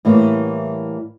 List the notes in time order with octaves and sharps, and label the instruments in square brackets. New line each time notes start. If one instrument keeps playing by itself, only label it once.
[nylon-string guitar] A2 E3 G3 A#3